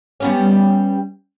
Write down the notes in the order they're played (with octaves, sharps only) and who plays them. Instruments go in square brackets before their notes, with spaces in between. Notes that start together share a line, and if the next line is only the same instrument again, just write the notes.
[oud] G3 B3 C#4